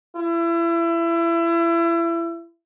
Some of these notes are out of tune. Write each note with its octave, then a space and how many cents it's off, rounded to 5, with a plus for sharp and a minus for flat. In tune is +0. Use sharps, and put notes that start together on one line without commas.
E4 +30